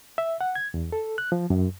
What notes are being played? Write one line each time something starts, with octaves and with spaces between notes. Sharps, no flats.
E5
F#5
G#6
E2
A4
F#6
F3
F#2